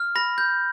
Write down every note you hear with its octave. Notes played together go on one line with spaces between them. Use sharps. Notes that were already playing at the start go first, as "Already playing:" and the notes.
Already playing: F6
B5 A#6
G6